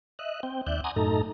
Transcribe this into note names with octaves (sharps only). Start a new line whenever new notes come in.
D#5 E5 F#6
C4 G5
D#2 D5 E5 F#6 G6
F#5 G#5 A#5 C6 D6 D#6
F#2 A2 A3 D#4 A4 A#5